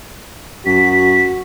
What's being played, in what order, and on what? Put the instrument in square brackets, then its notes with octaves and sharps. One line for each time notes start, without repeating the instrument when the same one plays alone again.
[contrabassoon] F#2 [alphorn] F#4 [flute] B6